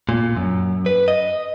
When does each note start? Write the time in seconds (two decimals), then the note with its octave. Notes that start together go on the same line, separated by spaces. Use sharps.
0.09 A#2
0.37 F#2
0.86 B4
1.08 D#5